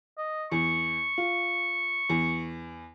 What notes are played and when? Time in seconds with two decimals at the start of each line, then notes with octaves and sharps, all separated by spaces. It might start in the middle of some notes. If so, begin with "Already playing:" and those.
0.17 D#5
0.52 E2 C#6
1.18 F4
2.10 E2